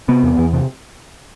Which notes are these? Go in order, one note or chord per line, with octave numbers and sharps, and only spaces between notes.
C3 B3
E2
E2
C3